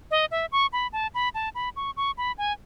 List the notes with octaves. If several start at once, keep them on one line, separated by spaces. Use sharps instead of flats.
D#5
E5
C#6
B5
A5
B5
A5
B5
C#6
C#6
B5
G#5